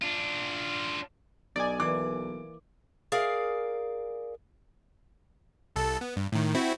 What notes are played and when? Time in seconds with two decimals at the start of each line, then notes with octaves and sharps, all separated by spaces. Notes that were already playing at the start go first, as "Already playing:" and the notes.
0.02 D4 F4
1.56 B1 D#4 D5 G#5
1.80 E3 A#3 D6
3.12 G#4 A#4 D5 F5
5.76 C2 A4 A5
6.01 B3
6.16 G2
6.32 A2 D#3
6.55 C4 E4 F#4